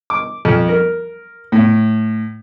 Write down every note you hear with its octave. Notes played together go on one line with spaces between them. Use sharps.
D6
F2
A#4
A2